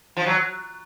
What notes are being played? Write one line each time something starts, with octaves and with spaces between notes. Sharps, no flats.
F3
F#3